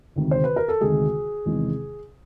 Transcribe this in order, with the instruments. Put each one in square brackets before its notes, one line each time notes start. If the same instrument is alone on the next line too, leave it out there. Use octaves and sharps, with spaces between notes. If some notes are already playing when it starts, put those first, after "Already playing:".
[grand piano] D2 C3 D#3 G#3
C5
B4
A#4
A4
D2 C3 D#3 G#3 G#4
E2 C3 D#3 G#3